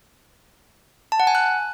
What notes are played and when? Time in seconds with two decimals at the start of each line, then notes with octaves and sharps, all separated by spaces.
1.12 A5
1.20 F#5
1.27 G#5
1.35 F#6